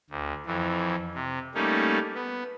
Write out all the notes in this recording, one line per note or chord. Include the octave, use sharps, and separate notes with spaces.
D2
F2 E3
C3
G3 A3 A#3 C#4 D#4
B3